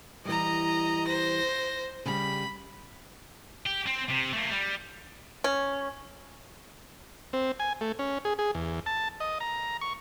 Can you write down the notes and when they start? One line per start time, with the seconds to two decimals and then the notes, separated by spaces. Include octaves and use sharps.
0.25 E3 G3 D#5 A#5
1.08 C5 A#6
2.06 C#3 G3 B5
3.67 G4
3.87 C4
4.10 C3
4.33 A3 A#3
4.50 G3
5.44 C#4
7.33 C4
7.60 G#5
7.81 A3
7.99 C#4
8.25 G#4
8.39 G#4
8.55 E2
8.86 A5
9.20 D#5
9.40 A#5
9.81 C#6